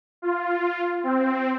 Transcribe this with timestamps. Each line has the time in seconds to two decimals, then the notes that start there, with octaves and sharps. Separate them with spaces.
0.22 F4
1.03 C4